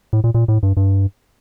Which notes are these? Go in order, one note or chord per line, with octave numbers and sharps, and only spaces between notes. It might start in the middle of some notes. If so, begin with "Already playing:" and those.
A2
A#2
A#2
A2
G2
G2